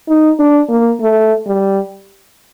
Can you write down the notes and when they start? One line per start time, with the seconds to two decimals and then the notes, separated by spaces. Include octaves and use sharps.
0.08 D#4
0.39 D4
0.69 A#3
1.01 A3
1.47 G3